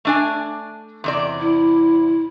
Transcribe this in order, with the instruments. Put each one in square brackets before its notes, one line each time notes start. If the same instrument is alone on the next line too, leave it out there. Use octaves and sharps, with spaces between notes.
[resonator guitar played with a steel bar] A3 D4 G#5
E2 C3 D5
[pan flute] E4